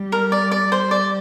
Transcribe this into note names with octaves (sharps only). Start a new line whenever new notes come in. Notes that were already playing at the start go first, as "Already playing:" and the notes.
Already playing: G3
A#4
D5
D5
G3 C5
D5